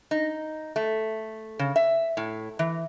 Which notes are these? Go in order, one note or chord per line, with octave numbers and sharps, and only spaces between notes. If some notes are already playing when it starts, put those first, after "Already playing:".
D#4
A3
C#3
E5
A2
E3